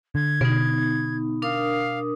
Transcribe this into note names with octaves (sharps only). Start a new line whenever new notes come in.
D3 G#6
B2 B3 D#4
D4 A#4 F5 D#6